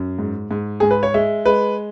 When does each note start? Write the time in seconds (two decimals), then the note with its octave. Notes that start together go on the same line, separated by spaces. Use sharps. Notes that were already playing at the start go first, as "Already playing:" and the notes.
Already playing: F#2
0.19 G#2
0.51 G#2
0.80 G#2 G#4
0.91 B4
1.03 C#5
1.14 G#3 E5
1.45 G#3 B4